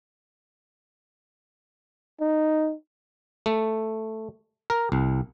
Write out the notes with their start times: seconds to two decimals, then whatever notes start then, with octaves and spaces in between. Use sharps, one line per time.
2.21 D#4
3.46 A3
4.70 A#4
4.92 C2